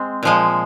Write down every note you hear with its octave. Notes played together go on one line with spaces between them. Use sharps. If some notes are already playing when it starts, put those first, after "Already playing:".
Already playing: G#3 C4
A#2 F3 G#3